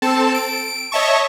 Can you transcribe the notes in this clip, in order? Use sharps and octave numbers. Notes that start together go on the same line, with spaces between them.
C4 A4 A5
D7
C#5 D#5 E5 A5 C#6